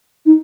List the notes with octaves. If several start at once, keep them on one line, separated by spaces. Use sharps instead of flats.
D#4